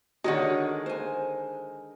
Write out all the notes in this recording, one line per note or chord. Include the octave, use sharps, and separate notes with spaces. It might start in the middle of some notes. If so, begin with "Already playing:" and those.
D3 D#3 G#3 D#4 F#4 C#5 D5 F#5
C5 G#5